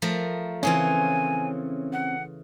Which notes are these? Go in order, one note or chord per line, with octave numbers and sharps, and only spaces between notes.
F3 A3 A#4
C#3 E3 C4 C#4 F4 G#5
F#5